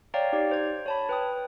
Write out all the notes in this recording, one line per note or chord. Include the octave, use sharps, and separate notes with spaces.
C#5 D5 F5 G5 A#5
D#4 G4 D5
C5 G#6
C#5 A5 B5
B4 G5 D#6